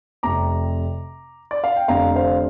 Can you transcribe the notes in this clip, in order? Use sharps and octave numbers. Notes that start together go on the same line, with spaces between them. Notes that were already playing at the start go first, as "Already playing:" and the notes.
F1 F2 C3 A#5 D6
D5
F5
G5
F1 F2 D3 F5 A#5
C5 F5